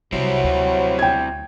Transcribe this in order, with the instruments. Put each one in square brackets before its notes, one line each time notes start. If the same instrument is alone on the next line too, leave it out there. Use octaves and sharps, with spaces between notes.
[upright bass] C2 [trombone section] C3 F#3 [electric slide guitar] C4 E4
[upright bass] D2
[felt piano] G5 G#6